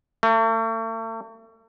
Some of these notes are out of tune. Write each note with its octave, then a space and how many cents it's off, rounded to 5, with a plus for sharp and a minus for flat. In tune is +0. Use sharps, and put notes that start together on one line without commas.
A3 +40